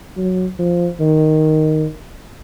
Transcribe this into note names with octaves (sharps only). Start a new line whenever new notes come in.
F#3
F3
D#3